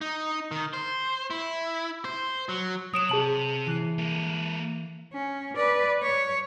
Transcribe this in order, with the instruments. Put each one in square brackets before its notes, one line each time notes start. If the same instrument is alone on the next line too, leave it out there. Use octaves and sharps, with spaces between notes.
[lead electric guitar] D#4
D#3
C5
E4
C5
F#3
[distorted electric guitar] F#3 [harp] C#5 [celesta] D#6 D7 E7
[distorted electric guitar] C3 [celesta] G#4 A5 F#7
[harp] E3 F#6 C7
[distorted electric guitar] A#3 A4
[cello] C#4
B4 D5
C#5